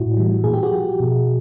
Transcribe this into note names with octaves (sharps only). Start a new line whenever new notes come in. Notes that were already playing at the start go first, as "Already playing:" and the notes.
Already playing: A2 E4 F#4
E3 G3
A#2 G#4
G4
F#4 G#4
F3
B2